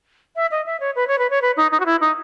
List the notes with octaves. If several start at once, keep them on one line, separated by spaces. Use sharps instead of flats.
E5
D#5
E5
C#5
B4
C#5
B4
C#5
B4
D#4
D#4
F#4
E4
D#4